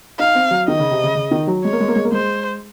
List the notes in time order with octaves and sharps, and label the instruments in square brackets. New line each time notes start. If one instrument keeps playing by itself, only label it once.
[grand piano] D#4 [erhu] F5
[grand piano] C4
F#3
[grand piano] D#3 [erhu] D#5
[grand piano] C#3
C3
C#3
C#3
D#3
F#3
[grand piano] G#3 [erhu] C#5
[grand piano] A#3
G#3
A#3
G#3
A#3
[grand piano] G#3 [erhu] C5